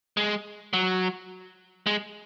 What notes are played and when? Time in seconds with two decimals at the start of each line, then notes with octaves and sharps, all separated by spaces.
0.17 G#3
0.73 F#3
1.87 G#3